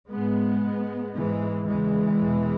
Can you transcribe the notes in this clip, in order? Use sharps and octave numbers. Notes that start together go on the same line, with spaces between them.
G#2 G#3 B3
G#2
G#2 E3 G#3
E2 C#3 E3 G#3
E2 B2